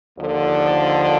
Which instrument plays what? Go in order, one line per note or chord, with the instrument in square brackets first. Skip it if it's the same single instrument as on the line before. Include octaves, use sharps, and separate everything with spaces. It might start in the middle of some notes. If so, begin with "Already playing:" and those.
[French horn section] D#2 D3 F3